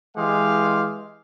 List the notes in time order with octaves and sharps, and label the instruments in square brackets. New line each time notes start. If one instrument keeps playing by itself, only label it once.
[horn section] E3 G#3 G4 F5